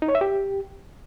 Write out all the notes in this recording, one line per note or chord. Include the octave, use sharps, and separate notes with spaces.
D#4
C#5
E5
G4